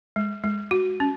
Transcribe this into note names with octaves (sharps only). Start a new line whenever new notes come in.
G#3
G#3
F#4
C#4